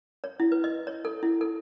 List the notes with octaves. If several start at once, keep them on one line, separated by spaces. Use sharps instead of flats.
C#5
E4
B4
D#5
C#5
A4
E4
A4